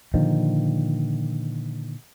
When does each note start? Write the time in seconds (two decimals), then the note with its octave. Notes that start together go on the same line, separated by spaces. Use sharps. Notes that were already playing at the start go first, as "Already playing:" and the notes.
0.14 A#2 D3 D#3 F3